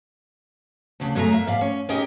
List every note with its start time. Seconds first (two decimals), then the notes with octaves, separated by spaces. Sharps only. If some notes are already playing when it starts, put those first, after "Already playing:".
1.00 D2 C#3 D4
1.15 F#2 G#3 A3 A4 E5 A#5
1.32 A#3 E5
1.47 G#2 D5 F5
1.61 C#4
1.89 C#4 D#4 G4 G#4 D#5 G5